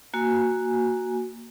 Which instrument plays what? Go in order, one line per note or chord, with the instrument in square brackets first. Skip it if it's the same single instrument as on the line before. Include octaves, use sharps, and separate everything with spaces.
[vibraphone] A#3 F#4 G#5